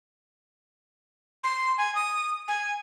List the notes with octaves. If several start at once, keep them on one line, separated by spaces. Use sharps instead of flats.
C6
G#5
D#6
G#5